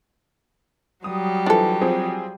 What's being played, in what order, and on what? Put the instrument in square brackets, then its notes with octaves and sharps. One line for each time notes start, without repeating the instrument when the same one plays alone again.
[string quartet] F#3 G3 [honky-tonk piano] D#6
[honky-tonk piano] E3 F3 [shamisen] D4 A4
[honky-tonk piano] F3 C4 G#4